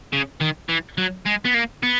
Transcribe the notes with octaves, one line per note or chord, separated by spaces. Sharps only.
C#3
D#3
E3
F#3
G#3
B3
A#3
B3